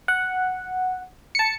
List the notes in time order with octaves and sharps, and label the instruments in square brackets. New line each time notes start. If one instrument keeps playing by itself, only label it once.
[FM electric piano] F#5
A5 C#7